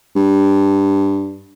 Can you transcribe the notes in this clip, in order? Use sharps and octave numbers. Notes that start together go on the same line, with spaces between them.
G2